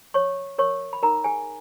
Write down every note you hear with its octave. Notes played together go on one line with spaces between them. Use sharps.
C#5 C#6
A#4 C#5 C#6
B5
D#4 A#4 A#5
G#4 G#5